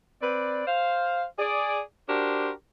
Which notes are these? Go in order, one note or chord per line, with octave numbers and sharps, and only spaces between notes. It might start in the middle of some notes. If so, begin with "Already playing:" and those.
C4 B4 D5
C5 F5
G#4 D5
D4 F#4 G4 A#4 C5